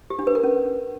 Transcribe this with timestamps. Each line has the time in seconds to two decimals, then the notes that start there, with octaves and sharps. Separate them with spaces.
0.10 G4
0.19 D4
0.27 B4
0.35 A#4
0.43 C#4